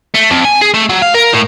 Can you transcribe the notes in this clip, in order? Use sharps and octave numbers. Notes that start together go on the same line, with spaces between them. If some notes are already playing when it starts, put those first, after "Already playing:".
A3
F2
G#5
G#4
A3
F#3
F5
A#4
A2